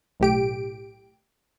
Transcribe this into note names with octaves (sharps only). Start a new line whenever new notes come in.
B1 A2 G4 D7